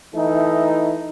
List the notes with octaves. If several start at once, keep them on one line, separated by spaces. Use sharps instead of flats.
E3 A3 D#4